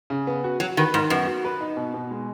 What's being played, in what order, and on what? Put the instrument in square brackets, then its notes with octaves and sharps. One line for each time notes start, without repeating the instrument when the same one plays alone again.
[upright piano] C#3
B3
F#4
[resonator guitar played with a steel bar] F#3 [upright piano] F#4
[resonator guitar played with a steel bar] D#3 [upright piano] B4
[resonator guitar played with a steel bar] G#2 [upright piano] D#3
[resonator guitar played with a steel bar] F#2 [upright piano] B3
[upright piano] F#4
B4
D#4
B2
B2
G#3